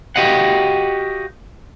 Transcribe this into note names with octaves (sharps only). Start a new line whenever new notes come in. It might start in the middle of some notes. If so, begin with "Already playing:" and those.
F#4 G4 D#5 F5 F#5